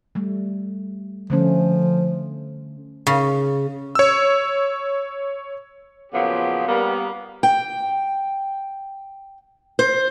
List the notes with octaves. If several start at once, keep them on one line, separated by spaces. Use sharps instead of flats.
G3 A3
D3 F3 A3 C#4
C#3
C#5 E6
A#2 C#3 F3 F#3 B3 G4
G3 A#3 B3
G5
C5